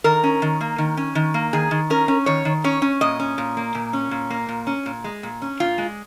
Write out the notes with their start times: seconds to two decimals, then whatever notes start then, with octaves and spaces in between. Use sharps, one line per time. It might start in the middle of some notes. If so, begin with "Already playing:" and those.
0.04 D#3 A#4
0.24 C#4
0.42 D#3
0.61 A#3
0.78 D#3
0.97 C#4
1.15 D#3
1.34 A#3
1.53 D#3 G#4
1.71 D#3
1.90 C#4 A#4
2.08 C#4
2.26 D#3 C#5
2.45 D#3
2.64 C#4 C#5
2.82 C#4
3.01 A#2 D#5
3.20 C#4
3.38 A#2
3.57 A#3
3.75 A#2
3.93 C#4
4.11 A#2
4.30 A#3
4.49 A#2
4.67 C#4
4.86 A#2
5.04 G#3
5.23 A#2
5.42 C#4
5.60 A#2 F4
5.78 G#3